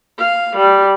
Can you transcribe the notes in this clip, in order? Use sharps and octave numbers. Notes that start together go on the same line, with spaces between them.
F5
G3